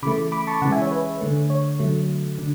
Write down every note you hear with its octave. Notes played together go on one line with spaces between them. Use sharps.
C#3 E3 A3 B5 D6
B5 D6
A5 C#6
C#3 E3 G#3 F#5 A5
E5 G#5
C#5
B4
D3 A3
C#5
D3 F#3 A3
D3